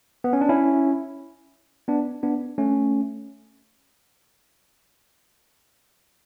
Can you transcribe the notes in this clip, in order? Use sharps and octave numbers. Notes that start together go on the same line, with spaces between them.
B3
C#4
D4
C#4 E4
B3 D4
B3 D4
A3 C#4